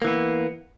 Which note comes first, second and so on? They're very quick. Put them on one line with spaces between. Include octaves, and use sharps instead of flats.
A#3 E3 B3